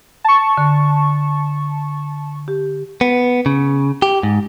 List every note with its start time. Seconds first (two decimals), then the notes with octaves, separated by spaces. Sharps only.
0.24 A5 C#6
0.57 D3
2.48 G4
3.01 B3
3.46 C#3
4.02 G4
4.23 G#2